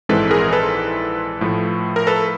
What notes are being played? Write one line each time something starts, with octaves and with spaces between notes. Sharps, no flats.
A#1 G#2 E3 G#3 C4 A4 B4
G#4 A#4
A4 B4
A2 F3 A3
A#4
A4 B4